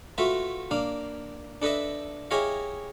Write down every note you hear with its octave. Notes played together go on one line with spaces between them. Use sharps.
A3 F4 F#4 B4 E5
A#3 D4 F5
D4 A4 B4 D#5 E5
E4 G4 G#4 C#5 D#5 F5